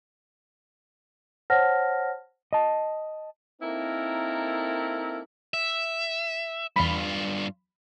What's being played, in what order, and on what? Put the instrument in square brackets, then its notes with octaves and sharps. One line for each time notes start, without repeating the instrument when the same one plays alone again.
[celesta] C5 C#5 F#5 A5 F6 A#6
[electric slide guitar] D#5 A5
[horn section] A#3 C4 D#4 E4 A4 A#4
[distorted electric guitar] E5
[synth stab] E2 B5 [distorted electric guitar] G2 F4